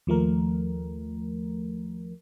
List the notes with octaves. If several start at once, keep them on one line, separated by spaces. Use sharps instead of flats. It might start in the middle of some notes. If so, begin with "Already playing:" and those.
D#2 F3 A3 A#4